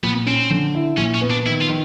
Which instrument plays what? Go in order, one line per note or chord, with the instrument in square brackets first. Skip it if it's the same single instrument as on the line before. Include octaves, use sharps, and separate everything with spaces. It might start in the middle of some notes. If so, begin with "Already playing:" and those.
[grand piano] A#2 [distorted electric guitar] B3
[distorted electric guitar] C4 [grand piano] C#4
[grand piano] D3
E4
[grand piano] A#2 [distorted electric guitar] C#4
[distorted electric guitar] C#4
[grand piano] B3
[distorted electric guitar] D4
[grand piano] D#3 [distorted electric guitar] E4
[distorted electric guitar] F4
[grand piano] D#3